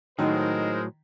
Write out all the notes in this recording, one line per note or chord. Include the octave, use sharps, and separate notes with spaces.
A2 D#3 F#3 G#3 D#4 A#4 C5 D#5